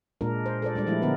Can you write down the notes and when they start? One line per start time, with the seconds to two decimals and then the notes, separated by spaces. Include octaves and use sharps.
0.21 A#2 G#3 D4 A#4
0.46 C5
0.62 A4 C5 D5
0.75 G3 G#3 D4 D5
0.87 F3 G#3 A3 E4
1.02 D3 B3 G#4 A#4 B4